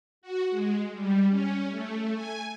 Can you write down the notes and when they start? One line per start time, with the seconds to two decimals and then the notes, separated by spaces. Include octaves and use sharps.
0.22 F#4
0.50 G#3
0.92 G3
1.29 C#4
1.70 A3
2.14 G#5